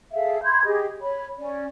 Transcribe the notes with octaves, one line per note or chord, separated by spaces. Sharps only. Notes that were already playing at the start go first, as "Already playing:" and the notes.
G#4 A4 E5 F5
B5 C6 G6 G#6
G4 G#4 D#5
C#5 B5
C#4 D5